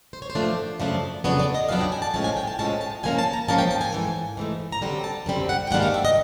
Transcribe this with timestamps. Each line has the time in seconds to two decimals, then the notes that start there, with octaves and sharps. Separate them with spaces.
0.13 C5
0.22 C#5
0.30 C5
0.35 F#2 C#3 F3 A3 D4
0.80 F#2 C#3 F3 A3 D4
1.24 F2 C#3 F#3 B3 D4 C#5
1.39 D5
1.54 D#5
1.68 F2 C#3 F#3 B3 D4 F5
1.81 G5
1.92 G#5
2.02 A5
2.14 A2 F3 G#3 C#4 A5
2.24 G#5
2.37 G5
2.47 A5
2.59 A2 F3 G#3 C#4 A5
2.81 A5
3.03 G#2 F3 A#3 C#4 G#5
3.19 A5
3.33 A#5
3.48 G#2 F3 A#3 C#4 A5
3.58 G5
3.71 A5
3.81 G#5
3.92 G#2 E3 A3
4.37 G#2 E3 A3
4.72 A#5
4.82 F#2 D3 G3 C4 A5
5.04 A5
5.26 F#2 D3 G3 C4
5.49 F#5
5.67 G5
5.71 G#2 D#3 G3 A#3 D4 F#5
5.83 F5
5.94 E5
6.05 D#5